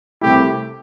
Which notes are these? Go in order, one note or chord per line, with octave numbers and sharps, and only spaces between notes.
C2 C3 A3 E4 G4